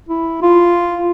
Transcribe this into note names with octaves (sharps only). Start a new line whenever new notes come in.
E4
F4